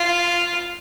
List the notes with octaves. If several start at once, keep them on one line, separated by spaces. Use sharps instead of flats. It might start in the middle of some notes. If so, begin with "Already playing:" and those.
Already playing: F4